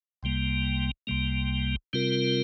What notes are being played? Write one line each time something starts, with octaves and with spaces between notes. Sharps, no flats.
C2 C3 G3 A#3
C2 C3 G3 A#3
C3 G3 C4 F4 A#4